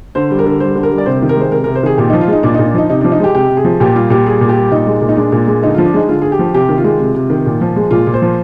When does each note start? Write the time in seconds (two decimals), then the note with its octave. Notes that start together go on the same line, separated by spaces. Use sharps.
0.15 D3 C5
0.31 G3
0.39 A#4
0.46 D3
0.60 G3 C5
0.76 D3
0.83 A#4
0.91 G3
0.98 D5
1.06 C3 C5
1.22 D#3
1.29 A#4
1.37 G#3 C5
1.52 C3 A#4
1.64 C3 A#4
1.75 C5
1.83 D#3 G#4
1.98 A#2 G4
2.10 F3 D#4
2.21 F4
2.28 G#3 D#4
2.43 A#2 D4
2.54 A#2 D#4
2.66 D4
2.74 F3 D#4
2.89 C3 D#4
3.01 F3 D4
3.12 D#4
3.20 G#3 G4
3.34 C3 G4
3.50 C3
3.57 G#4
3.65 F3
3.80 A#2 G4
3.95 G3 F4
4.10 A#2 G4
4.26 G3 G#4
4.41 A#2
4.49 G4
4.57 G3
4.71 A#2 D#4
4.87 G#3
5.02 A#2
5.09 D#4
5.17 G#3 D4
5.32 A#2
5.47 G#3
5.62 D3 D#4
5.75 F3 F4
5.85 D4
5.94 G#3 D#4
6.09 D3 F4
6.22 D3 G#4
6.32 G4
6.39 F3
6.54 C3 G4
6.69 D#3
6.78 F4
6.84 G#3
6.99 C3
7.15 C3
7.30 D#3
7.46 A#2
7.61 F3
7.76 G#3
7.91 A#2 F4
8.07 A#2
8.14 C5
8.22 F3